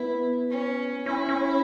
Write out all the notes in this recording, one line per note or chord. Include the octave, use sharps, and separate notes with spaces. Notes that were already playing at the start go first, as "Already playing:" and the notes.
Already playing: B3 E4
C#4
C#4 E4
C#4